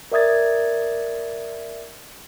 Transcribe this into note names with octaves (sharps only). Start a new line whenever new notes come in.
A#4 D5 E5 D#6 G#6 A6